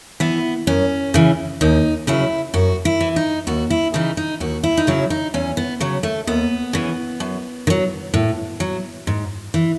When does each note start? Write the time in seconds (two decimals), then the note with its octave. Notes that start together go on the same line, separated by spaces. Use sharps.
0.20 E3 B3
0.67 F#2 C#4
1.14 C#3 E3
1.61 D#2 D#4
2.07 C#3 F#3 E4
2.54 F#2 F#4
2.85 E4
3.01 E3
3.16 D#4
3.47 D#2 F#4
3.70 E4
3.94 C#3 E3 D#4
4.17 D#4
4.40 D#2 F#4
4.63 E4
4.77 D#4
4.87 C#3 F#3 E4
5.10 D#4
5.34 E2 C#4
5.57 B3
5.80 C#3 F#3
6.03 A3
6.27 D#2 B3
6.73 C#3 E3
7.20 F#2
7.67 D#3
7.70 F#3
8.14 A2
8.60 F#3
9.07 G#2
9.54 E3